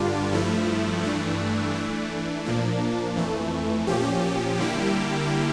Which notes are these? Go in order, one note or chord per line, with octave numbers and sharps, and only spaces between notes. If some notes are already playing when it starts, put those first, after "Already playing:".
Already playing: G2 D3 G3 D4 F4
G2 F3 A3 E4
G2 E3 A3 D4
E3 A3 D4
A#2 F3 A#3 D4
F2 E3 A3
A#2 F3 C#4 G4
D3 G3 A#3 E4 G4